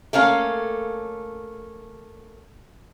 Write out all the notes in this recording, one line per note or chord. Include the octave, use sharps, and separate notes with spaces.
A3 A#3 C#4 F5